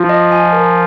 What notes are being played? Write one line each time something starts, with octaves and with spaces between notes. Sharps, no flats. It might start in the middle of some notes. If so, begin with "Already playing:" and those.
Already playing: F3 F4
D#5
G#5
A#4